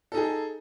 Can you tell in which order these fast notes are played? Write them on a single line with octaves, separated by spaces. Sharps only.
A4 D#4 G#4